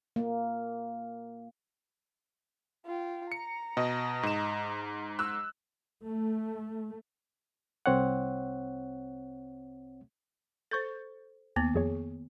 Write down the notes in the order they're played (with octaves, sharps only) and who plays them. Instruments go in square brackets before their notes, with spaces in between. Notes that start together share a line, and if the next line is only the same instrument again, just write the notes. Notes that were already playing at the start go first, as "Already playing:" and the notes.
[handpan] A#3
[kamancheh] F4 G5
[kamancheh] A#5 [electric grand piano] C#7
[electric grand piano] B2 [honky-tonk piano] D#5
[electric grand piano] G#2 E7
[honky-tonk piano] E6 F#6
[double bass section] A3
[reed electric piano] C2 C4 C#5 F#5
[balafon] A4 C5 [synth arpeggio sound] C#6 G6 A6
[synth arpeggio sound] D#2 [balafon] D#3 A#3 B3
[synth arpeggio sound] F2 G#4 C#5